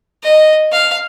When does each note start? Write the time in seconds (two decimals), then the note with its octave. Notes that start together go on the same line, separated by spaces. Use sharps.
0.23 D#5
0.72 F5